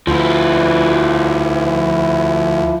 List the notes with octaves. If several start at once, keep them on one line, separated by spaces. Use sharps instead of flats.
D2 F3 E4